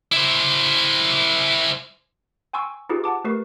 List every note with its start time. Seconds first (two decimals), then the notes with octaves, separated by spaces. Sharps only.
0.12 E4 C5
2.53 G5 G#5 C6 C#6 E6
2.89 D#4 F4 G4 G#4 B4
3.04 F#5 A5 D6
3.24 A3 G4 A#4 B4 C#6 C7